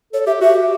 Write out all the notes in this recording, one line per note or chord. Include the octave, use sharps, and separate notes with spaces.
A4 C#5
G4 E5
F#4 E5
G4